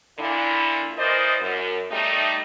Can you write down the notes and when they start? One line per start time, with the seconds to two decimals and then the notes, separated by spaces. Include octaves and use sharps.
0.18 A#2 D3 E4
0.97 E3 A#4 C5 D5 D#5
1.40 F#2
1.90 G3 A3 D#4